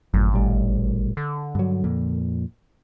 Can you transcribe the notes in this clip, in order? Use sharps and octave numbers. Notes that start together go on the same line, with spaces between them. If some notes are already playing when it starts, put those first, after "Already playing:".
G#1 F#2 A2
A#1 A2 G3
D3
G2 F#3
F2 A#2